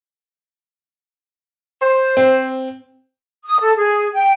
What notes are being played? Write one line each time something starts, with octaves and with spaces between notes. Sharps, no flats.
C5
C4
D#6
A4
G#4
G5